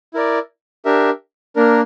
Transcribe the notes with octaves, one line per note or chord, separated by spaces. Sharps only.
E4 A#4 D5
D4 G4 A#4 E5
A#3 D4 A#4